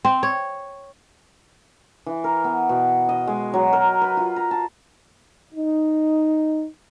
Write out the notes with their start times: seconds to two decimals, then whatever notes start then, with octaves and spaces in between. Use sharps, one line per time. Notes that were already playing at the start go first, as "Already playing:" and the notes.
0.05 C4
0.23 C#5
2.06 E3
2.24 A#4
2.44 B3
2.69 B2
3.09 D#5
3.27 G#3
3.54 F#3
3.73 A#4
4.02 B4
4.17 F4
4.36 A#5
4.51 A5
5.54 D#4